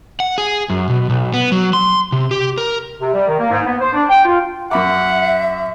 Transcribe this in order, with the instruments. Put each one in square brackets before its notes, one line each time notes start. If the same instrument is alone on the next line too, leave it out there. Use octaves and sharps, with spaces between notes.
[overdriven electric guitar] F#5
G#4
F#2
B2
B1
B3
F#3
C6
C3
G4
A#4
[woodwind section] C3
G3
D#3
A#3
G#2
B3
C5
D4
G5
F4
[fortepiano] F#2 B5 D6 [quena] E5 [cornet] F#5